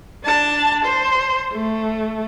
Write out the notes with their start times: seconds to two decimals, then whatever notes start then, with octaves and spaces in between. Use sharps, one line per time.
0.24 D4 A5
0.85 C5
1.53 A3